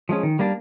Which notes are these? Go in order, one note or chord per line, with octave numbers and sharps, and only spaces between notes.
F3 G#3 C#4
D#3
G3 A#3 D4